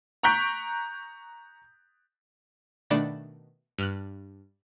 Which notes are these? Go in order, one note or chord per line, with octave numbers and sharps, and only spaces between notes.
A#5 C#6 F#6 G6 B6 D7
B2 D#3 A3 D4 D5 B5
G2 F6 F#6